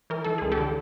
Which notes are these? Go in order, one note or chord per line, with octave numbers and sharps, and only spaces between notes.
E3 A#4
E3 A4
C#2 G#4
G4 A4
D3